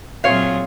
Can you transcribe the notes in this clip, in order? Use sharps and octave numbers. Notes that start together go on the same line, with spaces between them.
A#2 F#3 C4 F4 G#4 C#5 F5